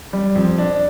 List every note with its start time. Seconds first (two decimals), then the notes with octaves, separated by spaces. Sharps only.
0.13 G3
0.35 F2
0.58 D4